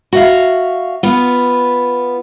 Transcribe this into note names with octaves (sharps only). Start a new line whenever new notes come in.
F#4 E5 F5
B3 F4